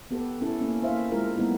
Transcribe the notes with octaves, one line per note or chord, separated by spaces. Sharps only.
B3 G4 A4 B4
C#4 E4 A4
A#3 C#4
A#3 E4 C5 E5 F5
G#3 E4 F4 A#4
G3 A3 B3 D#4 E4